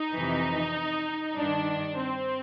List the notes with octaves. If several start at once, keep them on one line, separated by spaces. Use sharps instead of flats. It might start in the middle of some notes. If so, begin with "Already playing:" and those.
Already playing: D#4
F2 C3 E3
G2 D#3 D4
C4